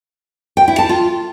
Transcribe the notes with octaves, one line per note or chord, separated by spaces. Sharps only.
G5
E4
A5
F4